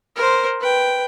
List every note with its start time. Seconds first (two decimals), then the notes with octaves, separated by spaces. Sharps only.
0.16 A#4 C5
0.60 B4 G5